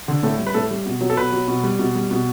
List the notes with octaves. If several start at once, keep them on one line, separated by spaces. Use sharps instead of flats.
D3
A2 A4
G3
B4
A2 A4
G3
B2
F#3
A4
B2 B4
F#3
B2
G3
B2
G3
B2